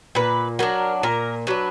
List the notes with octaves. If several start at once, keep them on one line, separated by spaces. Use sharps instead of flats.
A#2 B4
F#3 D4 A#4
A#2 A#4
F#3 D4 B4